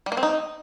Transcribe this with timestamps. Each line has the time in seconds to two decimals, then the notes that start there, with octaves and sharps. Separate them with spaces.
0.06 G3
0.12 A#3
0.17 C4
0.23 D#4